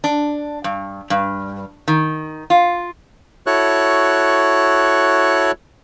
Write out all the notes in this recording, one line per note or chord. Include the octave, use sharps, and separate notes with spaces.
D4
G2
G2
D#3
F4
E4 F#4 A4 C#5 F#6